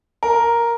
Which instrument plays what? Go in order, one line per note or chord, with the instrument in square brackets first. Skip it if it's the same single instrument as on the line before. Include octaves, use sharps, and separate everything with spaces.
[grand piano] A#4